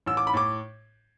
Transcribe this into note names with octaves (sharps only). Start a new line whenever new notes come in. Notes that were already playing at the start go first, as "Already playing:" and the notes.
A1 E6
D6
B5
A2 D6